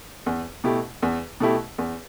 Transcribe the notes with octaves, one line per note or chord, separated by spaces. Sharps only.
E2
B2 A3 E4 G4
E2
B2 A3 E4 G4
E2